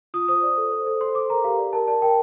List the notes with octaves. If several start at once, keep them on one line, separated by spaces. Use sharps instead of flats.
F4 D#6
C5 D#6
D5
A4
C5
A4
C5 C6
A4 D6
A#4 A#5
G4 F5
D5
A#4 A5
D5 A5
A#4 G5